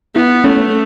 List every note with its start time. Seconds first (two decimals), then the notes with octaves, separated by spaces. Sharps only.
0.15 B3 E4
0.44 A3 C#4